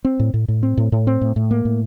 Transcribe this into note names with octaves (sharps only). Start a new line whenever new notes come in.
C4
A2
A2
A2
C4
A2
A2
C4
A2
A2
A#3
A2